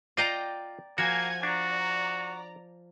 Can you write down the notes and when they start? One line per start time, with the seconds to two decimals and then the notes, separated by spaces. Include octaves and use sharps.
0.17 F4 D5 D#5 F5 G5 A#5
0.98 F3 A#3 F#4 F#5 G#5 G#6
1.43 D4 F#4 D5 A#5